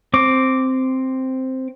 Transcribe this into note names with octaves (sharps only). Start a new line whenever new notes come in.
C4 D6